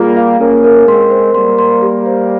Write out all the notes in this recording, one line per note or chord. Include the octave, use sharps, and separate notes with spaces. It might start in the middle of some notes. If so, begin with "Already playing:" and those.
Already playing: G3 A#3 F4 G#4
F5
A#3 C#4 A#4
A#4
G#3 C4 C6
C5
G3 A#3 C6
C6
G4
C5